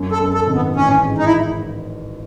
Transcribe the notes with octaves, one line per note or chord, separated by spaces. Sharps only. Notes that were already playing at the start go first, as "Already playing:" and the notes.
Already playing: F#2
A4
F#2
A4
G#1
B3
A1 C#4
G#2
D#4
E4